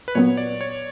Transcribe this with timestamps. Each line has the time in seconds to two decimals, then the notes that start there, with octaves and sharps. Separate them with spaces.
0.08 B4
0.15 A#2 F#3 B3 C#5
0.37 D5
0.61 C#5